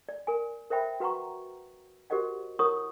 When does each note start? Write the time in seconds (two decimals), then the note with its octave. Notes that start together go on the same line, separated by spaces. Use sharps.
0.09 D5
0.27 A#4 G#5
0.70 A#4 C5 E5 G5 B5
1.00 F#4 B4 F#5 A#5 C#6
2.10 F#4 G4 A#4 C5 D#5 F#5
2.59 E4 A#4 C#5 F#5 C#6 D#6